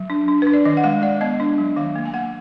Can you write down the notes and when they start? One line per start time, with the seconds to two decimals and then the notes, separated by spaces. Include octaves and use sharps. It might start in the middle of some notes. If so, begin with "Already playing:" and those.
Already playing: F#3
0.10 D4
0.28 D4
0.42 D4 B4
0.53 D5
0.65 D#3 D#5
0.77 F#5
0.84 G#3 F5
1.02 G#3 D5
1.21 B3 D#5
1.40 D4
1.58 F#3
1.76 D#3 F5
1.96 A#3
2.05 G#5
2.14 A#3 F#5